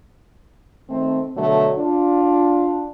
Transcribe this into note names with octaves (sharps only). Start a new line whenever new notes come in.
D#3 A3 C4
B2 D3 F#3 A3
D4 F4